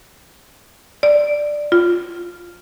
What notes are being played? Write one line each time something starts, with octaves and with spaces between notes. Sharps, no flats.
D5
F4